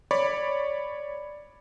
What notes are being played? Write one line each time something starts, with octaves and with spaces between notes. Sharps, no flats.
C#5 D5 B5 C#6 D6